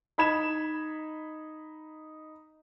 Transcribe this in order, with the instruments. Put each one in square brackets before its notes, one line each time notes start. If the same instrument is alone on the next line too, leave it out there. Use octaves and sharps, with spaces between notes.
[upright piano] D#4 B5 G#6 E7